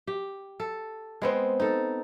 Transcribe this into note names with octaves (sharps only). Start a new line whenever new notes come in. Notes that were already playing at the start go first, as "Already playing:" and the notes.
G4
A4
G#3 B3 C4
D#4 A4